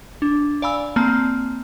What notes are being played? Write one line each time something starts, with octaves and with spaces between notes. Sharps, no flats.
D4
D5 F5 G#5 B5 E6
A#3 C4 A5